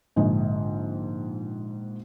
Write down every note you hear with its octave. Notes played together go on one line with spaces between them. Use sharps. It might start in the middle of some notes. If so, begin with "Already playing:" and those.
A#1 G#2 D3 D#5 G#5